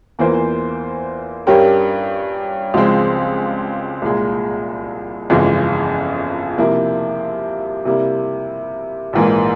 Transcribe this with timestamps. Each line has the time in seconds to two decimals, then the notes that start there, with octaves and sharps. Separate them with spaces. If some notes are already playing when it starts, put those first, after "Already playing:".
0.19 E2 E3 A#3 F4 C5
1.47 G2 G3 C#4 G4 A#4
2.74 C#2 C#3 F3 G#3 C4
4.02 C2 A#2 G#3
5.30 G1 F2 C#3 E3 G#3
6.58 C3 F3 A#3 E4
7.85 C3 G3 A#3 E4
9.13 A#1 G#2 E3 A#3